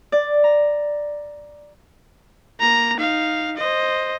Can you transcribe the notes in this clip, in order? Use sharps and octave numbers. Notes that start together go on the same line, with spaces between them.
D5
A#5
A#3 A#5
D#4 F5
C5 D#5